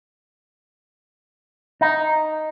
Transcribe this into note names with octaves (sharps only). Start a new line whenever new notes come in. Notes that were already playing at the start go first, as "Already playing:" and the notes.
D#4